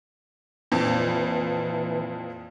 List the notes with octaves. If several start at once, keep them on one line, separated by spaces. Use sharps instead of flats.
F2 A#2 E3